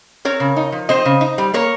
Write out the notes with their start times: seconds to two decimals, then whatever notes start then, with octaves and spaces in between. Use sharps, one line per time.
0.25 C4 A#4 C#5
0.40 C#3
0.57 D#4
0.72 F3
0.89 C4 C5 D#5
1.06 C#3
1.21 D#4
1.38 G3
1.54 A#3 A#4 C#5